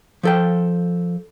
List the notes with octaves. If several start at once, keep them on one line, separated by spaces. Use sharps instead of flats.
F3 A4 G5